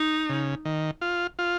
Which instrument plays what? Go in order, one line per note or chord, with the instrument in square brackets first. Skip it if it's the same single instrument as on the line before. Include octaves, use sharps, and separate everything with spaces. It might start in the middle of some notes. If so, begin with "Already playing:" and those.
Already playing: [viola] D#4
[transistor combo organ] C#3
D#3
F4
F4